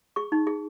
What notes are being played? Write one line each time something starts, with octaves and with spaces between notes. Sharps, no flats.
G#4 C#6
D#4
G#4